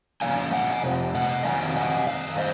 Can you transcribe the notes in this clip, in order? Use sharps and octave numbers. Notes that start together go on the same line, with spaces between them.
F2 C#3 F3 A#3 F5 G#5
D#5 F#5
F2 C3
D#5 F#5
F2 C3 D#3 F#3 F5 G#5
D#5 F#5
F#2 D#3 F5
C5 D#5